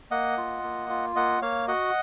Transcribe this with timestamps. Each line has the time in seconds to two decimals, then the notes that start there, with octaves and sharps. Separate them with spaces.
0.11 A#3 D#5 F#5
0.37 F4
0.63 A#3
0.90 F4
1.16 A#3 D#5 F#5
1.42 A#3 C#5 F5
1.68 F#4 D#5 F#5